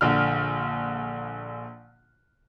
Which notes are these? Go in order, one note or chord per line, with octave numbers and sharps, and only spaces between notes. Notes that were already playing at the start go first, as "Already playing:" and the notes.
A#1 D3 F6